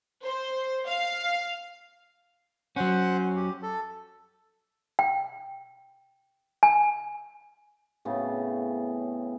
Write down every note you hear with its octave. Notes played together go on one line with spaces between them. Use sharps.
C5
F5
F#3 C#4 C5 F#5
G4
A4
G5
G#5
A2 C#3 B3 C4